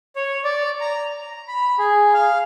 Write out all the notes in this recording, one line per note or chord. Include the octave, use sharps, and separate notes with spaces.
C#5
D5
A#5
A#5
B5
G#4
F5